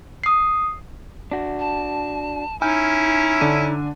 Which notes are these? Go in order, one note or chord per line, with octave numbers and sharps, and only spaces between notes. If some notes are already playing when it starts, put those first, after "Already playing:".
D#6 C7
D4 F#4
A5
C#4 D#4 E4 G#5 F6 G6
D3 D4 D#7